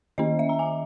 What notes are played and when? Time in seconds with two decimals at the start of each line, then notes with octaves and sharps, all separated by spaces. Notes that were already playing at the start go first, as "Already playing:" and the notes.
0.18 D#3 A#3 C#4 D#5
0.39 E5
0.49 A#5
0.59 G#5